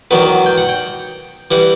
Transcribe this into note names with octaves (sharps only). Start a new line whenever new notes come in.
E2 D#3 F#3 B4
G5
F#5
G5
E3 G3 F#5